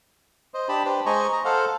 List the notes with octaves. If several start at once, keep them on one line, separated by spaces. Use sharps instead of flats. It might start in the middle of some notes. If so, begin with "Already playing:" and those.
C5 D#5
D4 G4 A5 B5
D4 G4 B4 C5
G#3 C5 D#5 G#5 A#5 C#6
D#5 A#5
A4 C5 F5 F#5